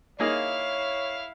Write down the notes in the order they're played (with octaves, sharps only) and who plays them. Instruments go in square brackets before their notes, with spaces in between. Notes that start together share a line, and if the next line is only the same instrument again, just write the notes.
[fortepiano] A#3 D#4 G#4 [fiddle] E4 F5 [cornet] C#5